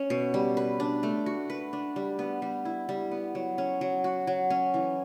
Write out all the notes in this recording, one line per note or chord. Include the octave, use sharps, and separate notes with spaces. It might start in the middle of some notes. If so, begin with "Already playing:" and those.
Already playing: C#4
B2
G3
B4
D4
A3
F#4
B4
D4
G3
B3
G3
E4
G3
B3
F#3
C#4
F#3
F#4
F#3
C#4
E3